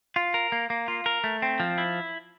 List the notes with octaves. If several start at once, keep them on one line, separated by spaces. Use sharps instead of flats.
F4
A#4
A#3
A#3
F4
A#4
A3
C4
F3
E4